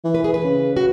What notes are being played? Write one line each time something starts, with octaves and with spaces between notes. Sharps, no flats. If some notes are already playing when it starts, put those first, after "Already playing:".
E3
B4
G#4
B4
C#3
F#4